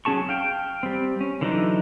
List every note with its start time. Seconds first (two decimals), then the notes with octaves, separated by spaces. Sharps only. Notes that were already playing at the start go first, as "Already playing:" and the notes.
0.05 F#3 C#4 G#4 A5 C#6
0.29 F5 G5
0.83 G3 C4
1.21 C#4
1.41 D3 E3 F#3 D4 D#4